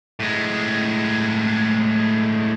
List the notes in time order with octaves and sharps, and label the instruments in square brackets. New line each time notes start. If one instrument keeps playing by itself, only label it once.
[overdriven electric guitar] A2 G#3